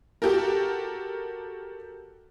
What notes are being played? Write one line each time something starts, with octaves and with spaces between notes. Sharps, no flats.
F#4 G4 A4 A#4